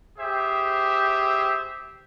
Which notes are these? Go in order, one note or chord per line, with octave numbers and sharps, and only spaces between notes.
G4 G#4 C5 E5